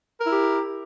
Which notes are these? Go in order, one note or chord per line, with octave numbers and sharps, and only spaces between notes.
E4 G4 A#4